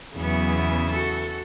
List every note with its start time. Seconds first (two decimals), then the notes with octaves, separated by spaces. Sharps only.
0.16 E2 C#3 F#3 B3 E5
0.90 F#4 A4